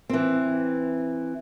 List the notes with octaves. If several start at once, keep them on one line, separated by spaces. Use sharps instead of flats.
E3 C4